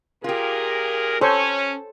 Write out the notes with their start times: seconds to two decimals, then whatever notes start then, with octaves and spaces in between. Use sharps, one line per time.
0.24 A#2 F4 G4 G#4 A#4
1.21 C#4 A4 C5 C#5